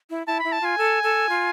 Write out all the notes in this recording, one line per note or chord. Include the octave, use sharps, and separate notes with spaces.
E4
E4 A5
E4 B5
A5
F4 G#5
A4
A4
F4